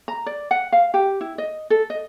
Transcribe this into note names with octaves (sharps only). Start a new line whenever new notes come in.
A#5
D5
F#5
F5
G4
E4
D#5
A4
D#5